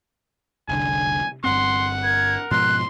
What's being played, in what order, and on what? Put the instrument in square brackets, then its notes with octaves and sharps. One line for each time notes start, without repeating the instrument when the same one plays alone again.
[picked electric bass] F1 C2 D3 [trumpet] G#5
[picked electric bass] G1 G2 C4 [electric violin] F#5 [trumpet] C6
[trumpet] A#4 [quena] G#6
[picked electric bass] G#2 B2 F3 [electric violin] C6 [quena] F#6